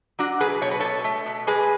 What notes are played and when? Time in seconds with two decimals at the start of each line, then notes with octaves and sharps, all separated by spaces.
0.19 F#3 D4 F#4
0.40 B2 G#4 B4
0.61 B2 C#5
0.71 B4
0.80 B2 A4 C#5
1.04 A3
1.26 B2
1.47 G#3 G#4 B4